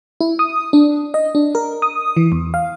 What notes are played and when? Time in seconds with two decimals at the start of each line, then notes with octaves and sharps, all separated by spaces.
0.21 E4
0.39 D#6
0.73 D4
1.14 D#5
1.35 D4
1.55 A#4
1.82 D#6
2.17 E3
2.32 E2
2.54 F5